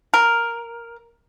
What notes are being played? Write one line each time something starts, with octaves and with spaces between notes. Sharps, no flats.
A#4